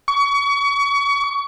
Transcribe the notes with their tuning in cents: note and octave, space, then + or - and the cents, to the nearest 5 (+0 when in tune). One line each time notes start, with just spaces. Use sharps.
C#6 +30